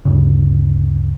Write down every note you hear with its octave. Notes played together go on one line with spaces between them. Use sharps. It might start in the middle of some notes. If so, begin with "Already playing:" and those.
D2 G2 C#3